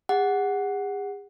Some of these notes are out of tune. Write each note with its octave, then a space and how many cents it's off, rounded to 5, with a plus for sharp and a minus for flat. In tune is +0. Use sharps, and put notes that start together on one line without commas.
G#4 -45 F#5 +0